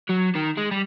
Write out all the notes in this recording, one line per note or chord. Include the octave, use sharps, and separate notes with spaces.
F#3
D#3
G#3
G3